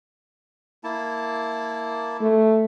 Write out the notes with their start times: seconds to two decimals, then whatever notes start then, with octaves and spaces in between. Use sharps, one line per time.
0.84 A#3 E4 A5
2.21 A3